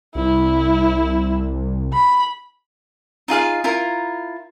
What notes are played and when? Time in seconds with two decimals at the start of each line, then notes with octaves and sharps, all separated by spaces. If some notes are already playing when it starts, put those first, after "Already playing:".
0.15 C2 E4
1.94 B5
3.28 D#4 F4 G#4 F5
3.64 E4 F4 A#4 A#5